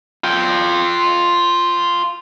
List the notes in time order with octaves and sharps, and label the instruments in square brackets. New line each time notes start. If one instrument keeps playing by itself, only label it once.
[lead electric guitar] F4 G5